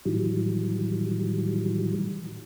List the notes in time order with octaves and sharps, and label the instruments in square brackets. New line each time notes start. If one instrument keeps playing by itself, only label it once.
[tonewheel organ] A2 D#3 E3 F#3 G3